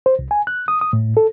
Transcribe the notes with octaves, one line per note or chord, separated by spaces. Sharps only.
C5
C2
G#5
F#6
D#6
D#6
A2
A4